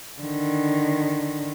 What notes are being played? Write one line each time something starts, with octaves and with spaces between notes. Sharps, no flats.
D3 D#3